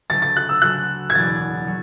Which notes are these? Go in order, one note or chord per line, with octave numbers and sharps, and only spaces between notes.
D2 C#3 F#3 A6
A6
F#6
E6
D2 C#3 F#3 F#6
G#6
F#1 E2 B2 F#3 A6
F#3